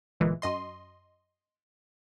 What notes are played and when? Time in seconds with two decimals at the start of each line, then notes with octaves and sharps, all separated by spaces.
0.20 G1 A#2 E3 G#3
0.42 F#2 D#5 C6